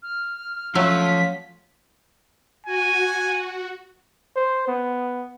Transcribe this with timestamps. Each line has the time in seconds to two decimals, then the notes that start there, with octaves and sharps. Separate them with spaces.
0.03 F6
0.75 F3 F#3 A3 C#4 F4 B6
2.66 F#4 G#5
4.36 C5
4.68 B3